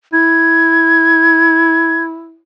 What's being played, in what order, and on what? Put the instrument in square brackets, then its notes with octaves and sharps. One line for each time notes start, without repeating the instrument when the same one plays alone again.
[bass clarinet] E4 [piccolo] G#6